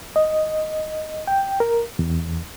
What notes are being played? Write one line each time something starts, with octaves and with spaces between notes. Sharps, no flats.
D#5
G5
A#4
E2